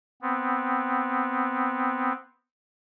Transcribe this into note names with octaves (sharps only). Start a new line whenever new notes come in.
B3 C4